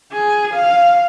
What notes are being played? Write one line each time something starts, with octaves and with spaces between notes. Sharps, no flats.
G#4
F5